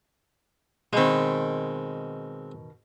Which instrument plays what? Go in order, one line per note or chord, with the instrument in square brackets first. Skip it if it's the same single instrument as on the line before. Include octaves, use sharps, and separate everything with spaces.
[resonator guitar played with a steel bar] B2 D#3 [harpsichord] G#3 C4